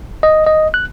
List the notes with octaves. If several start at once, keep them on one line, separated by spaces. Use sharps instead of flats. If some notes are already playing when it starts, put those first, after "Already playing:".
D#5
D#5
F#6